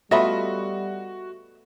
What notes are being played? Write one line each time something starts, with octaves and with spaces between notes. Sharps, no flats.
G3 A3 B3 F4 F#4 D#5 E5 B5